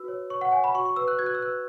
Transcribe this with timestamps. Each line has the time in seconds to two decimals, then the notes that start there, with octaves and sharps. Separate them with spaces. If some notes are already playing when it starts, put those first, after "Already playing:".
Already playing: F#4 B4 E6
0.08 C#5
0.30 C#5 C#6
0.41 F#5
0.52 C#5 G#5
0.64 B5
0.75 F#4 C#6
0.85 C#6
0.96 B4 E6
1.08 F#6
1.19 F#4 G#6
1.26 F#6
1.35 E6
1.41 B4 F#6